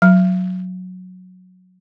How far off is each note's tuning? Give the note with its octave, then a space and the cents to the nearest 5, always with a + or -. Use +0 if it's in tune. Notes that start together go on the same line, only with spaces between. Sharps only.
F#3 -10